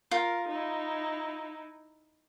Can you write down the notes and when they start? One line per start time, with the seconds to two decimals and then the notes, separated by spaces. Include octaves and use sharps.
0.11 F4 A#4
0.49 D#4 E4